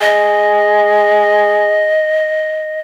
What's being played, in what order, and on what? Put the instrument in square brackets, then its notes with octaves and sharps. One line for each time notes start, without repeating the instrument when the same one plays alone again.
[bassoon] G#4 [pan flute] D#5